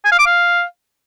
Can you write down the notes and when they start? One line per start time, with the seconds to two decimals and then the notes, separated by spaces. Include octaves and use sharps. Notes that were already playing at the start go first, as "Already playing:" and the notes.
0.05 G#5
0.12 F5
0.19 D6
0.26 F5